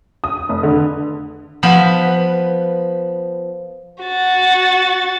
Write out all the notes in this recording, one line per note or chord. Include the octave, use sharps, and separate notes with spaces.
D#6
F1
D3
F3 B3 B4
F#4 A6